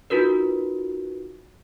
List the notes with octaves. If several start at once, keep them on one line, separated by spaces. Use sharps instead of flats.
D#4 F4 F#4 A#4 B4